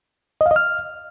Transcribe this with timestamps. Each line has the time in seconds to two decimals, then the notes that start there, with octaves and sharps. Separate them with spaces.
0.41 D#5
0.46 F5
0.51 D#5
0.56 F6